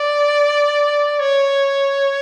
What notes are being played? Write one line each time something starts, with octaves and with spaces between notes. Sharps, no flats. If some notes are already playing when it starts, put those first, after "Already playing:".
Already playing: D5
C#5